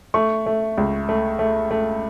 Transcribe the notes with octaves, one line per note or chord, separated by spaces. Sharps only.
A3 C#6
A3
C#2
A3
A3
A3